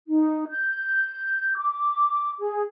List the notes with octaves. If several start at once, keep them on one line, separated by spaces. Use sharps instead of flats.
D#4
G6
D6
G#4